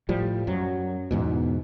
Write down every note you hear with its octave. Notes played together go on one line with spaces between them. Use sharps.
A2 F3 G3
F#2 F#3
E2 G#2 B2